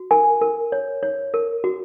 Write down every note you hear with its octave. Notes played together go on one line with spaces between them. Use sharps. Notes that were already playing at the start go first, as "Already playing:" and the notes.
Already playing: F#4
A#4 G#5
A#4
C#5
C#5
A#4
F#4